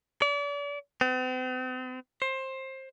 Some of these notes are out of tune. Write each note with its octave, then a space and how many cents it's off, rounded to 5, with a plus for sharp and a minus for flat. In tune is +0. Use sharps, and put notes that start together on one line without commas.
D5 -40
C4 -45
C5 +20